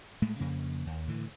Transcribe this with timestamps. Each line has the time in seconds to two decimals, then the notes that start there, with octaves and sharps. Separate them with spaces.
0.22 A2 G#3 A3
0.40 F2 C#3 A#3
0.87 D#2
1.08 A2 D3 E3